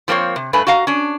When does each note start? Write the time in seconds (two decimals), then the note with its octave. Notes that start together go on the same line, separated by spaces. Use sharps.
0.08 F3 A#3 C4 B4 C#5
0.36 C3
0.53 G2 A3 B4 G#5
0.67 F#4 D#5 F5 A#5
0.87 C#4 D4